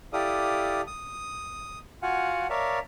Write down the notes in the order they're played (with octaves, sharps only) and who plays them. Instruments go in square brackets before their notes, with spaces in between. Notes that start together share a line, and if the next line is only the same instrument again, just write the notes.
[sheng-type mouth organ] E4 G4 A4 D5 F5 D#6
D#6
F4 F#4 F5 F#5 G#5
A#4 C#5 D5 E5 F5 A5